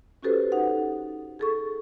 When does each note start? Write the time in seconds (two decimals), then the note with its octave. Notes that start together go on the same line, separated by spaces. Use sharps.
0.23 C#4 F#4 G4 A4 B4 C5
0.52 D#4 F#5
1.39 G#4 A4 C#6